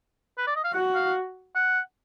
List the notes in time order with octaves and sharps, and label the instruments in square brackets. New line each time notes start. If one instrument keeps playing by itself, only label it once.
[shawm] B4
D5
D#5
F5
[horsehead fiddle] F#4 [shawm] F#5
[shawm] F5
F#5